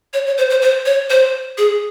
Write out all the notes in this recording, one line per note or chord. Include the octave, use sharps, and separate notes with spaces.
C#5
C#5
C5
C5
C5
C#5
C5
G#4